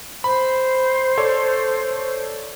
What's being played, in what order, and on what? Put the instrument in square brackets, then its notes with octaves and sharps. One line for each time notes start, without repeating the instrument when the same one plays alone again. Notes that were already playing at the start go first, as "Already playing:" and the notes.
[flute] C5 [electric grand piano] B5
[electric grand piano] A4 C#5 D5